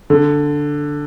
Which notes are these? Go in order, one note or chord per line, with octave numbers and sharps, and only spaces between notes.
D3